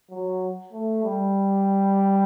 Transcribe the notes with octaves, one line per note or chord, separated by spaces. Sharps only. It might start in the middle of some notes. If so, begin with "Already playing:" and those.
F#3
A3
G3